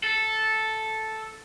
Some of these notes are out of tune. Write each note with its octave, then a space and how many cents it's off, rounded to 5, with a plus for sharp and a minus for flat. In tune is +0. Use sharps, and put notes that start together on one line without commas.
A4 -5